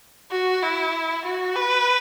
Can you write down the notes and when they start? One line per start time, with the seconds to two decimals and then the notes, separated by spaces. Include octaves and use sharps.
0.31 F#4
0.63 E4
1.25 F#4
1.56 B4